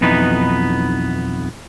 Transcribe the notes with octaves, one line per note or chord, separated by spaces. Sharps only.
B1 F2 E3 B3 D#4 B4